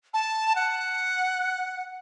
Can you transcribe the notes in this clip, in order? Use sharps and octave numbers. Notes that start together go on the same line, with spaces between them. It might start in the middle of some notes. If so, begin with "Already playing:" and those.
A5
F#5